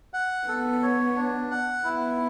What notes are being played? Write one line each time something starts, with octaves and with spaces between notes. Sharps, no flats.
F#5
B3 A4
C#5
D4
F#5
B3 E4